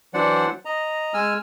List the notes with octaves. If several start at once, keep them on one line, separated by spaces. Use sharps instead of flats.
E3 F#3 D4 C5 D5 F#5
D#5 A#5
G#3 G#5 E6 F6